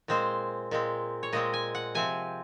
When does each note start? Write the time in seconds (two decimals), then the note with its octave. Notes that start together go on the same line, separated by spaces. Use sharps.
0.08 A#2 G#3 C4 C5
0.71 A#2 G#3 C4
1.23 C#5
1.33 A#2 G#3 C4 D#5
1.54 G#5
1.75 F#5
1.95 C3 F3 C4 G#5